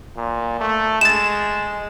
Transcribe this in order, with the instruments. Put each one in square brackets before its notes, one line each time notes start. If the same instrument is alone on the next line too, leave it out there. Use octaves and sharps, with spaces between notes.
[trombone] A#2
A3
[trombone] G#3 [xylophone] A6 E7